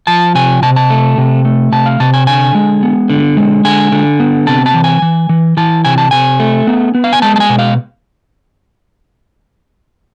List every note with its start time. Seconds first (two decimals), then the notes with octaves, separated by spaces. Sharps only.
0.07 F3 A5
0.35 C3 G#5
0.62 C3 A5
0.76 A5
0.90 A3
1.18 C3
1.45 A3
1.72 C3 A5
1.86 F5
2.00 C3 A5
2.14 G#5
2.27 D3 G#5
2.55 G#3
2.83 B3
3.10 D3
3.37 G#3
3.64 D3 G#5
3.92 D3
4.20 B3
4.47 C3 A5
4.66 A5
4.74 E3
4.84 G#5
5.02 E3
5.29 E3
5.57 E3 A5
5.85 C3 G#5
5.98 A5
6.11 C3 G#5
6.40 A3
6.67 B3
6.95 B3
7.04 F5
7.13 G#5
7.22 G#3 A5
7.36 A5
7.40 G#5
7.49 B2
7.59 F5